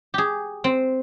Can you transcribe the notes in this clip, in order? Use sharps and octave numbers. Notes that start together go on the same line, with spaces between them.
G4 G#4
C4